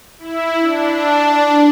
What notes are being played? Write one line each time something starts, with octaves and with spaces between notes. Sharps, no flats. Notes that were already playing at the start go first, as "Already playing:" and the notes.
E4
D4